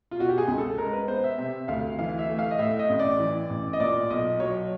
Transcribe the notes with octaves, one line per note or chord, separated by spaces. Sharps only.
F4
B2 F#4
G4
G#4
C#2
A4
G#3 A#4
B4
B3 C5
E5
C3 E5
D2 F5
E3 F5
E5
A3
F5
D#5
A2 E5
D#5
A1
D5
E3
A1
D#5
A#2 D5
B1 D#5
F#3 C#5